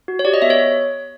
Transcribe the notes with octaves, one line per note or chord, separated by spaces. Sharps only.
F#4
C#5
G4 D5
D#5
B3 E5
C#5